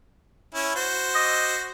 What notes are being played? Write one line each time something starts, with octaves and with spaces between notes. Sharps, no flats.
C#4 E4
F#4 C5
D#5